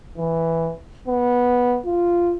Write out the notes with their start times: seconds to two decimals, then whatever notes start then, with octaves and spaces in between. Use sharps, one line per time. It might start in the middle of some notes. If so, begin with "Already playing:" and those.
0.18 E3
1.07 B3
1.86 F4